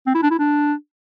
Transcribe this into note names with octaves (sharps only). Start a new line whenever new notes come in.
C4
E4
D4
E4
D4